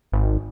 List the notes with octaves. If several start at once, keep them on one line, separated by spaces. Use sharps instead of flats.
G#1